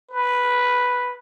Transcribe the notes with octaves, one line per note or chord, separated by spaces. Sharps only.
B4